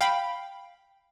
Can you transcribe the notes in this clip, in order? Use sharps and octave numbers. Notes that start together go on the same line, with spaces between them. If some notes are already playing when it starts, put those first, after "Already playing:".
F5 G5 B5